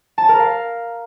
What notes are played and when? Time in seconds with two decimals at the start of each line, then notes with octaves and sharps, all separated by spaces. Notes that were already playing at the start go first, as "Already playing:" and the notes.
0.18 A5
0.29 A#4
0.39 F5